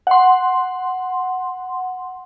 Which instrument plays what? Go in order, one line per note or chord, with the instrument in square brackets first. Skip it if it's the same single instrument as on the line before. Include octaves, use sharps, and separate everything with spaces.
[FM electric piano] F#5 C6